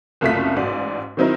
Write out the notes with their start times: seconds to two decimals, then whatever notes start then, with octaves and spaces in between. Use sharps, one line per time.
0.21 F#1 C2 F#2 A3 F4 B6
0.56 A1 G#2 F#4 D5 F5
1.17 D#3 F#3 C4 D#4 E4 A#4